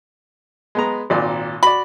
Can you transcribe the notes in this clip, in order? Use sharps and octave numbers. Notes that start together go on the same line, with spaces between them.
G#3 B3 A#5
G#1 A#2 D5
F#4 D5 B5